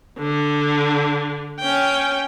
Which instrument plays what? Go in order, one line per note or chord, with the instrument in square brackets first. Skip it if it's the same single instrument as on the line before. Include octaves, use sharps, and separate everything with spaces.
[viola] D3
C#4 G5